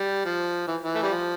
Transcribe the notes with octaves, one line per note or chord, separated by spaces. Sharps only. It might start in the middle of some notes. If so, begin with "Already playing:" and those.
Already playing: G3
F3
E3
E3
A3
G3
F3